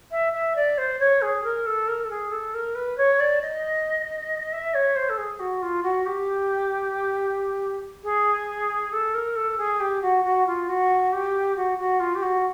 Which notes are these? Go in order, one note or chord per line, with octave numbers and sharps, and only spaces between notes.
E5
E5
D5
C5
C#5
G#4
A#4
A4
A#4
A4
G#4
A4
A#4
B4
C#5
D5
D#5
E5
C#5
C5
A4
G#4
F#4
F4
F#4
G4
G#4
A4
A#4
A4
G#4
G4
F#4
F#4
F4
F#4
G4
F#4
F#4
F4
G4
F#4